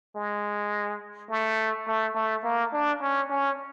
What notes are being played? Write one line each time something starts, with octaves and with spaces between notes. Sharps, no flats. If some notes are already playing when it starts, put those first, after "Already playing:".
G#3
A3
A3
A3
A#3
D4
C#4
C#4